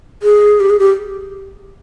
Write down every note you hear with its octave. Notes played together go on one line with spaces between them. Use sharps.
G#4
G4
G#4
G4